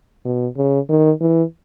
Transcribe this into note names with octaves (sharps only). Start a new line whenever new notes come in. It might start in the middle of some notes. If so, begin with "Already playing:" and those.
B2
C#3
D#3
E3